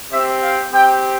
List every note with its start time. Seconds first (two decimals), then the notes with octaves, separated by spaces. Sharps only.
0.12 C4 G4 E5
0.43 F5
0.73 C4 G4 G5